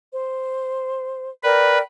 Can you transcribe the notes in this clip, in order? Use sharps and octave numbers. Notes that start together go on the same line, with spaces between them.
C5
A#4 B4 D5 G5